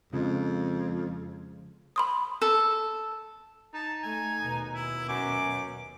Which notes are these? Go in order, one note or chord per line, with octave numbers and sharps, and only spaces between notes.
F2 C#3 F3 G#3
B5 C6 D#6
A4
D#4 A5
A3 G#5
D#2 B2
E4
F#2 D6